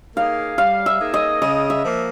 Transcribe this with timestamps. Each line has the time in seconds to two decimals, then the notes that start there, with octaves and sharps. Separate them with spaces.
0.16 A#3 D#4 G#4 F5
0.58 G3 F5
0.86 E5
1.00 A#3 D#4 G#4
1.14 D#5
1.42 C#3 D#5
1.70 E5
1.84 F3 A#3